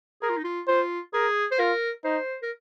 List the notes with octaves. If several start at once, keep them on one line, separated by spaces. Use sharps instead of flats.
G#4 A#4
F4
D#4
F4
F4 C5
G#4 A#4
C5
F4 A#4
D#4 C5
A#4